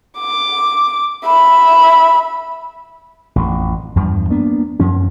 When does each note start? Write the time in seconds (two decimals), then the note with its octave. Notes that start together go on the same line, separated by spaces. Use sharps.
0.19 D6
1.25 E5 B5
3.36 A1 F2
3.96 E2 G2 F3
4.30 A#3 B3 D4
4.79 F#2 F3 C#4